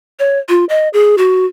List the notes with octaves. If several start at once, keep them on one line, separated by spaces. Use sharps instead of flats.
C#5
F4
D#5
G#4
F#4